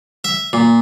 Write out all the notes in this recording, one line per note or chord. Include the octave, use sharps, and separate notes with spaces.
E5
A#2